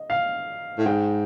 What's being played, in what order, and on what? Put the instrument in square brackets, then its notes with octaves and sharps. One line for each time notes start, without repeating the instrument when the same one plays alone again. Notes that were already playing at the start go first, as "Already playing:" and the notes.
Already playing: [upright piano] D#5
F5
[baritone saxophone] A2
[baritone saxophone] G#2 [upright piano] G5